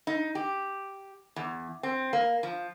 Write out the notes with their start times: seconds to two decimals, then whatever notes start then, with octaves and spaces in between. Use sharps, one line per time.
0.07 D#4
0.35 G4
1.36 E2
1.83 C4
2.13 A#3
2.43 F3